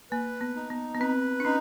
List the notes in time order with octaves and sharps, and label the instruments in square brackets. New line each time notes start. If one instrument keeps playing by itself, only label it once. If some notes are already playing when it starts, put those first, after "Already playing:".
[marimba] A#3 [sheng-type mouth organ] B4
[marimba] B3
[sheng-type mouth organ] D#4
[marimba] B3
B3
[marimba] C4 [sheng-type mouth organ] B4
[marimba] D4
[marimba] C#4 [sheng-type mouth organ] D#4